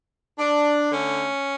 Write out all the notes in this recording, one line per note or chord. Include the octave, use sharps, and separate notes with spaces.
D4
D3 A3 C#4